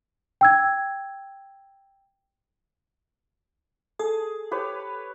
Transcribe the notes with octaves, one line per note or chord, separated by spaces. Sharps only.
G5 E6 G#6
G#4 A4
G4 B4 C#5